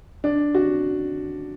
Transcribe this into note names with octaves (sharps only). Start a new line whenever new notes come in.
D4
F#4